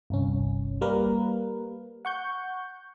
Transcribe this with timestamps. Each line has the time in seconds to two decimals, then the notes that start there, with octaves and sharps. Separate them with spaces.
0.10 G1 C2 C#4
0.81 G3 A#3 A#4 B4
2.05 F#5 C#6 G6